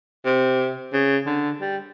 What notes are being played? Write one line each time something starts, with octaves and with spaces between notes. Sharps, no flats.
C3
C#3
D3
G3